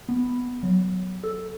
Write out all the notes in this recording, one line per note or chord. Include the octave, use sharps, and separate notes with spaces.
B3
F#3
A4